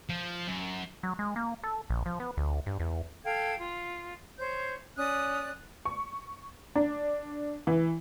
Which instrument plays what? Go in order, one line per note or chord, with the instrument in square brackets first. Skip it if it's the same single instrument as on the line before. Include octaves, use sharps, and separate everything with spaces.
[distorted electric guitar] F3
F#2
[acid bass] F#3
G#3
A#3
A4
A#1
F3
B3
D2
G2
E2
[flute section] A4 F5 G5 G#6
F4
C5 C#5 G6
C#4 D5 D#6 F#6
[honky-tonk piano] C#6
D4
E3